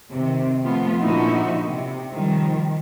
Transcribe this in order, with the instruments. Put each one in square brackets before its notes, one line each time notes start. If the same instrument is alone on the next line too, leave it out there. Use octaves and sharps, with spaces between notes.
[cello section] C3 D#3
F3 A3 B3 C4 F4
A#2 D3 F3 D#4 E4 F#4
C3
D#3 F3 G3